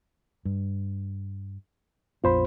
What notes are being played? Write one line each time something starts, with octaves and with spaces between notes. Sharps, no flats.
G2
A#1 F2 B3 F4 C5 B5